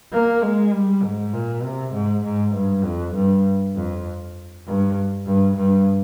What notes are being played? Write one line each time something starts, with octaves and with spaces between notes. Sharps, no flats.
A#3
G#3
G3
G#2
A#2
C3
G#2
G#2
G2
F2
G2
F2
G2
G2
G2